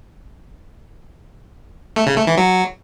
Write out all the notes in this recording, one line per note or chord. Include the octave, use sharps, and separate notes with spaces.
A3
C#3
A3
E3
F#3